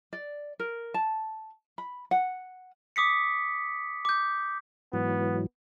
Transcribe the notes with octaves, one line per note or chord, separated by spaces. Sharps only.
D5
A#4
A5
B5
F#5
D6 D#6 B6 C#7
D6 G6
G#2 E3 F#3 B3